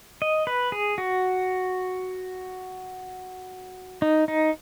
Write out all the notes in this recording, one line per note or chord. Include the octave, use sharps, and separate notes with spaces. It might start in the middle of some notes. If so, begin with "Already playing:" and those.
D#5
B4
G#4
F#4
D#4
D#4